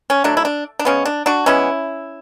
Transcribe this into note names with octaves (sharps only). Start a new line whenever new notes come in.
C#4
D3 F#3 A3 D4
E4
D4
D4
C#3 G#3 B3 C#4
D4
D4 F#4
E3 G#3 B3 C#4 E4